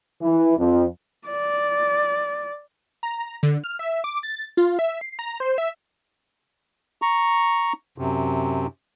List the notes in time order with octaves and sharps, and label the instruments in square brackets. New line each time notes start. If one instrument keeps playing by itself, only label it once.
[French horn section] E3
F2
[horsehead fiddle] D5
[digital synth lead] A#5
D3
F6
E5
D6
A6
F4
E5
C7
A#5
C5
E5
[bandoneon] A#5 C#6
F#2 C3